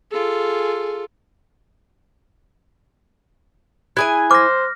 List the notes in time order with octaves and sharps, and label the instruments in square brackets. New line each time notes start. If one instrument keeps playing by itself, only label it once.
[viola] F4 A4 [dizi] G#4
[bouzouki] E4 G#4 G#5 [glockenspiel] F#6
[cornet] C5 [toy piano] D6 [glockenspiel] F6 A#6